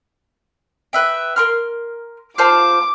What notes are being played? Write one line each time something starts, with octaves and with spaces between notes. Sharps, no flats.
B4 E5 G5
A#4 C6 F6
F4 C5 A5 D6